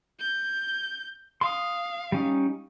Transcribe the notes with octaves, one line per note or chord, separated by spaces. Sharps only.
G6
F5 C6 D#6
G3 C#4 D#4